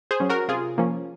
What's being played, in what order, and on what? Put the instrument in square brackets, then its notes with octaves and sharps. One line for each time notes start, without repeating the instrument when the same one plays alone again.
[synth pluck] G#4 C5
F#3 C#4
F#4 A#4
C3 F4 G#4
F3 A#3 C#4